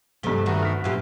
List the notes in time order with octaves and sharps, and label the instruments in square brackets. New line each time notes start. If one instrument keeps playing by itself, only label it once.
[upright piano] G2 G7 [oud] C3 A3
[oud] D#3 [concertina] A3 B3 F#4
[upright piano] F6 B6
[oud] F#2 A#2 G4 [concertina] B4 E5 F5